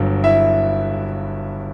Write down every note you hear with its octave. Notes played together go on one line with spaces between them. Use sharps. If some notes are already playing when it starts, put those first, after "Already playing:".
Already playing: G1 G2 F#3
E4 E5